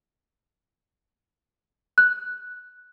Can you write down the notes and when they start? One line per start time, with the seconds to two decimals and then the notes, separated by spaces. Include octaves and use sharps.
1.98 F#6